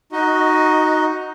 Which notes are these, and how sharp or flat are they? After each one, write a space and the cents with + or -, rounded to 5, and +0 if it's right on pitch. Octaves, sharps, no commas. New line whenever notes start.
D#4 +0 F#4 +0 D#5 +15